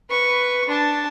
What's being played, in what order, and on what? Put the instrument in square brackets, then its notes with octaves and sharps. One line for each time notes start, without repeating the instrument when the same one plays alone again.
[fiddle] B4 C#6
D4 A5